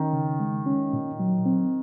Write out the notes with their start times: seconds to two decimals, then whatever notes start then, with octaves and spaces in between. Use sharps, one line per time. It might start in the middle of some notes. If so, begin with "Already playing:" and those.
Already playing: D#3 C#4
0.13 C#3
0.40 G#3
0.66 C#4
0.93 A#2
1.20 F#3
1.45 C4